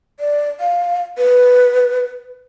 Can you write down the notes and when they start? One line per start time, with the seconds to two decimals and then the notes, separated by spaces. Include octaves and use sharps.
0.20 D5
0.60 F5
1.18 B4